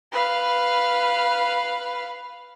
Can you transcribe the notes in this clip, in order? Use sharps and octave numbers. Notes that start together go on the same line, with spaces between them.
B4 F5